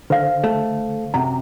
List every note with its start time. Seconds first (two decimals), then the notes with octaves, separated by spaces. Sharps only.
0.10 D3 C5 F5
0.44 A3
1.14 F#2 C3 A#5